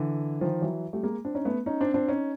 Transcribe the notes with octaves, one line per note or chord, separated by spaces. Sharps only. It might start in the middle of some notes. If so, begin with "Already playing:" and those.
Already playing: D3 E3
D#3 F3
E3 F#3
G3 A3
G#3 A#3
C4 D4
C#4 D#4
A3 B3
C#4 D#4
C4 D4
C4 D4
C#4 D#4